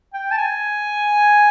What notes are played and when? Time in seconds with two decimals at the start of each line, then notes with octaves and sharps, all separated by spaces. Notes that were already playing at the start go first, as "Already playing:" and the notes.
0.14 G5
0.31 A5
0.38 G#5